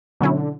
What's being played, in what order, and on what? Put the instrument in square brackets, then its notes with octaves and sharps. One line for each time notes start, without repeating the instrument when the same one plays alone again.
[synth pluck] B2 F#3 C#4 E4 [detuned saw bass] D3